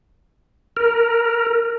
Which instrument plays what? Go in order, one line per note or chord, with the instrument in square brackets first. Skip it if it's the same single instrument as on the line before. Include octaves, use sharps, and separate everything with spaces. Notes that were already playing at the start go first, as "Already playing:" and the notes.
[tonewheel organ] A#4